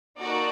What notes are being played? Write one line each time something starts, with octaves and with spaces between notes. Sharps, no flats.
A#3 D#4 F#4 A4 D5